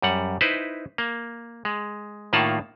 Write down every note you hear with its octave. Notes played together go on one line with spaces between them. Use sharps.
F#2 G3 F#5
D#4 E4 B4 C5
A#3
G#3
A2 D#3 A#3 F4 F#5 A5